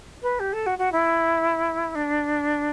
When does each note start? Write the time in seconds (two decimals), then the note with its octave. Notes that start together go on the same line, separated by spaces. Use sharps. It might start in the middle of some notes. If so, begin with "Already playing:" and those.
0.22 B4
0.40 G4
0.53 A4
0.66 F#4
0.78 F#4
0.92 E4
1.95 D4